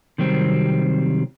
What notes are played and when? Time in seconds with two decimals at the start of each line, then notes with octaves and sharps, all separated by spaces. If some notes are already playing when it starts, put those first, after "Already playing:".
0.18 C3 D#3 F#3 G3 C4